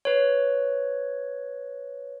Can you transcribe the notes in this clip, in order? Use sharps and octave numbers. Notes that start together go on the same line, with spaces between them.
B4 C#5